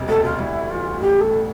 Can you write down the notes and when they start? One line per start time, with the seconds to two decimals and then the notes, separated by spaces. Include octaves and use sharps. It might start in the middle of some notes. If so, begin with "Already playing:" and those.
Already playing: E1 C3 G3
0.08 D2 A4
0.24 F4
0.39 G3 E4
0.70 E3 F4
1.00 A1 G4
1.21 A4
1.30 A2